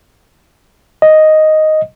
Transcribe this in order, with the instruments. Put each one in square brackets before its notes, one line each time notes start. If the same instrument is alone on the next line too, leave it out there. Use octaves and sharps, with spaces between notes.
[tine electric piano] D#5